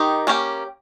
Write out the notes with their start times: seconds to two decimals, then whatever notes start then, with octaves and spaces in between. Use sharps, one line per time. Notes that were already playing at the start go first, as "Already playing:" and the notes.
Already playing: D#3 D#4 G4
0.27 A#3 C#4 G4